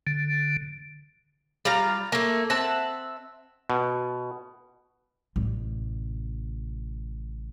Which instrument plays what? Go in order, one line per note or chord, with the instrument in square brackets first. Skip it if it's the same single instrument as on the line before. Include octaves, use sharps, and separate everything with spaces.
[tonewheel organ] D3
[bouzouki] G3 F4 F5 A#5
A3 A#3
C4 E5 F#5 A5
[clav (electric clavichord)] B2
[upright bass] A1 C3